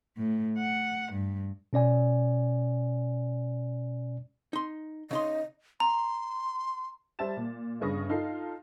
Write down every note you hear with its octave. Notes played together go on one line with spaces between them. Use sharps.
A2
F#5
G2
B2 C#4 D5 G#5
D#4 C6
C#3 D#4 D#5 C6
A#5 C6
G3 C5 E5 A5 A6 E7
A#2
G1 G2 C#3 C#6 D#6 A#6
D#4 F4 A4 C7